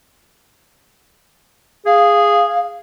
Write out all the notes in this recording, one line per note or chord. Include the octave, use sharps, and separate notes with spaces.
G#4 F5